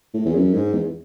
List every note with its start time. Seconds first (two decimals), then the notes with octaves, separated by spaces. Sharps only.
0.14 A2
0.26 E2
0.35 F#2
0.54 G#2
0.74 E2